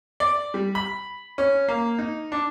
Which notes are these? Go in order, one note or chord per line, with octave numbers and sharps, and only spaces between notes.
D5
G3
B5
C#4
A#3
D#4
D4